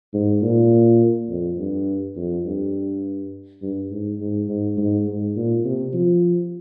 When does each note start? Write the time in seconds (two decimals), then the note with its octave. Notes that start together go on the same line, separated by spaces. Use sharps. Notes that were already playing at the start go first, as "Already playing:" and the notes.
0.13 G#2
0.42 A#2
1.29 F2
1.58 G2
2.16 F2
2.45 G2
3.62 G2
3.90 G#2
4.20 G#2
4.49 G#2
4.77 G#2
5.07 G#2
5.36 A#2
5.64 C3
5.93 F3